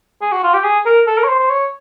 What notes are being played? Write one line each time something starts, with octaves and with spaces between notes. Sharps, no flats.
G#4
F#4
F4
G4
G#4
A#4
A4
A#4
C#5
C5
C5
C#5